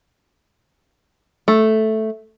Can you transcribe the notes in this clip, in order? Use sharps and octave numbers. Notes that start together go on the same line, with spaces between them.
A3